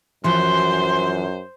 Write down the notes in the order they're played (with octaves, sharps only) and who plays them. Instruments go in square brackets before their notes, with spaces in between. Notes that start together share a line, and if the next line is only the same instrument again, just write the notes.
[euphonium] F#2 [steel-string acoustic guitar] E3 F3 F#4 [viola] C5 [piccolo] C6